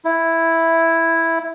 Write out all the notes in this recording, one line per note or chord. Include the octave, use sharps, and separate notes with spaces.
E4